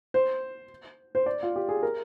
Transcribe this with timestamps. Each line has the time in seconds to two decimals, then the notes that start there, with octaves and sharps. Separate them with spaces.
0.14 C5
1.15 C5
1.26 D5
1.43 F4
1.56 G4
1.69 G#4
1.83 A#4